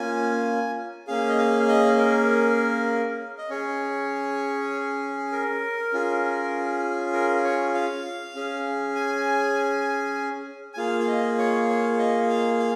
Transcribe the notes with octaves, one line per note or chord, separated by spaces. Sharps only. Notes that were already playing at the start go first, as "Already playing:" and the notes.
Already playing: A#3 C#4 F4 G#5
A#3 C#4 G#4 F5
D#5
F5
D#5
A#4
D#5
C#4 G#4 C#5
A#4
C#4 F4 G#4
A#4
C#5
F5
C#4 G#4
G#5
G#5
A#3 F4 G#4 F5
F5
D#5
C#5
C#5
D#5
F5
F5